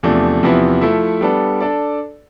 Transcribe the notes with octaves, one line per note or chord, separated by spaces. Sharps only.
E2 C3 F3 A3 D4
E2 C3 F3 B3 E4
F3 A3 E4 A4
G3 B3 D4 A4
D4 A4 D5